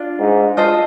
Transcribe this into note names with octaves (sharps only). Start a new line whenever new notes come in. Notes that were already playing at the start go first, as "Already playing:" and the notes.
Already playing: D4 F4
G#2
F4 A4 C5 D#5